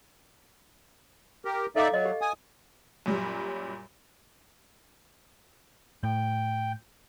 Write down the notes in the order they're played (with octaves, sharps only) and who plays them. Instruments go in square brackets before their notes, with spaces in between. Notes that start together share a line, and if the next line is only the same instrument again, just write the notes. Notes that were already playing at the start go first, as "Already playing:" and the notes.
[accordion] G4 A#4
[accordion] D#4 D5 E5 [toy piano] A4 F5 D6
[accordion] F#3 [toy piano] D#5
[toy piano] G4
[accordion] G#5 D#6
[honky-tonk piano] F#2 A#2 F#3 G3
[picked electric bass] A2 [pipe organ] G5